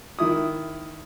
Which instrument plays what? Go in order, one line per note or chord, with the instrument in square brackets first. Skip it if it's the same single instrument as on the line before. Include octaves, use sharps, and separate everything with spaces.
[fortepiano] D#3 E4 D#6